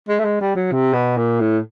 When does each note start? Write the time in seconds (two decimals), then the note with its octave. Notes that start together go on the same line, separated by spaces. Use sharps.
0.09 G#3
0.19 A3
0.25 G#3
0.41 G3
0.55 F#3
0.71 C3
0.93 B2
1.17 A#2
1.40 A2